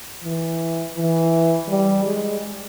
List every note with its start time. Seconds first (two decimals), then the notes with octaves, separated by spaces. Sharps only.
0.24 E3
0.96 E3
1.69 G3
2.05 G#3